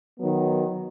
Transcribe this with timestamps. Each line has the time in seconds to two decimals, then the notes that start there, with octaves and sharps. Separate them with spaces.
0.19 D#3 F#3 B3